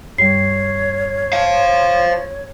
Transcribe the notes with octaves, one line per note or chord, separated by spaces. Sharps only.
G2 G3 C#5 C7
C5 F5